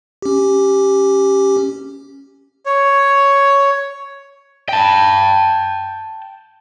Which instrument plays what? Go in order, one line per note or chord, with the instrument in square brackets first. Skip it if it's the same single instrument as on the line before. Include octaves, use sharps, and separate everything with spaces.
[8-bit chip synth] C#4 G4
[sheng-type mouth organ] C#5
[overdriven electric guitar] G5 A5